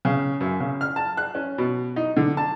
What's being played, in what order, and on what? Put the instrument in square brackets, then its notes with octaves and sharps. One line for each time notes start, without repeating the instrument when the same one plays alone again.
[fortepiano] C#3
F#2
C#3
F6
A5
F#6
C#4
B2
D#4
D3
A5